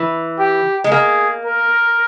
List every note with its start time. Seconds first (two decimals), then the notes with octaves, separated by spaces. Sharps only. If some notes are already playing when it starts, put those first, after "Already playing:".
Already playing: E3
0.39 G4
0.84 G#3
0.91 A#3 G#4
1.45 A#4